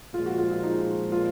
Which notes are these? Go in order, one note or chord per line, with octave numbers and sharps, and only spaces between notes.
A#2 F3 G#3 F4
F#4
F4
F4
D#4
F4